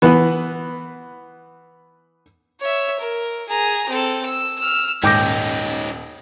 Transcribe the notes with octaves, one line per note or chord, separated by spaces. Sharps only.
E3 B3
C#5 E5
A#4
G#4 A#5
C4 A4
E6
E6 F6
D#1 G#2 D#3 C#4 D#4 G5 D6 A#6